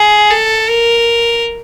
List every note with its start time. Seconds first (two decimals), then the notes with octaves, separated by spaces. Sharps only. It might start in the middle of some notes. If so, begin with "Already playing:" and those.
Already playing: G#4
0.30 A4
0.69 A#4